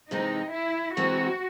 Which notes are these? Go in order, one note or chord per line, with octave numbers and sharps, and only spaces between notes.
C3 E3 G#3 C4 D#4
E4
C3 E3 G#3 C4 F#4